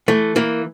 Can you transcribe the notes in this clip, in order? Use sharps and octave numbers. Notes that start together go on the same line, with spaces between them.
E3 A3
E3 A#3